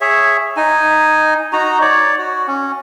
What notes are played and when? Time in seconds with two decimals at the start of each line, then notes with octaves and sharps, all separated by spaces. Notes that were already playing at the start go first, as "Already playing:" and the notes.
0.01 G#4 C#5 E5
0.57 D#4 G#5
1.53 D#4 F#4 A#5
1.81 C#5 D5
2.18 F#4
2.48 C#4